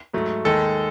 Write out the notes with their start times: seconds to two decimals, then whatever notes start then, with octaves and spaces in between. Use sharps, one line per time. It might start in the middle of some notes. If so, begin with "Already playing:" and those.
0.14 G#2 F#3 A3
0.45 D#2 D#3 G#3 A4